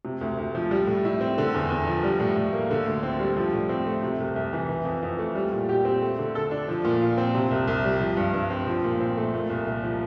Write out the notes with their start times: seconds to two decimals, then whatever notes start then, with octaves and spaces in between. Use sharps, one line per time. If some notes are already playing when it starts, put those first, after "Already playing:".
0.05 C3
0.21 D2
0.38 D2
0.55 F3
0.71 G3
0.87 A2
1.05 E4
1.21 C4
1.38 D3
1.54 E2
1.70 E2
1.87 F3
2.03 G3
2.20 A2
2.36 A2
2.53 A#3
2.71 D3
2.86 D2
3.03 C4
3.20 G3
3.37 F3
3.53 A2
3.69 C4
3.87 A3
4.03 C3
4.20 C2
4.36 C2
4.53 E3
4.69 E3
4.85 F2
5.03 F2
5.19 A3
5.35 G3
5.52 A#2
5.69 G4
5.85 C4
6.02 A3
6.19 D3
6.35 A4
6.51 D4
6.68 F3
6.85 A#2
7.01 F4
7.18 C4
7.35 C3
7.51 C2
7.68 C2
7.84 G3
8.00 F3
8.17 G2
8.34 G2
8.50 C4
8.67 F3
8.84 A#2
9.00 C4
9.17 A3
9.34 A#2
9.50 C2
9.66 C2
9.83 F3